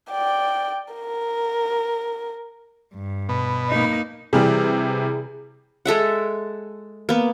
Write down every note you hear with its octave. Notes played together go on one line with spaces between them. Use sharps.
D5 G5
A#4
G2
B2
A#3 D#4
C3 E3 G3 G#4
G#3 A4 E5 F#5
A#3 B3